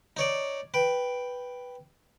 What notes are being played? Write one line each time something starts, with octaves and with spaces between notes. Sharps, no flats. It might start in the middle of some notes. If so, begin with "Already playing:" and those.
D#4 C#5 D5
B4 G5